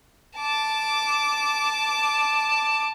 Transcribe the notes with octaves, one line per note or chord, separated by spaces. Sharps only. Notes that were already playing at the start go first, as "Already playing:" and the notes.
A5 D6